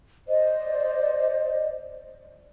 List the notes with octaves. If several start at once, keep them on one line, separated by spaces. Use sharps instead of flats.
C5 D5 D#5